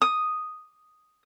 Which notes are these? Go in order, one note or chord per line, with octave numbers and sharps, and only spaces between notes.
D#6